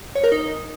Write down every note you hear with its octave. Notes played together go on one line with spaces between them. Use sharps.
C#5
A#4
D#4